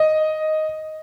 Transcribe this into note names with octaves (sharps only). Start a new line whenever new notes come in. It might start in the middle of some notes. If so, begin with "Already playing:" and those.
Already playing: D#5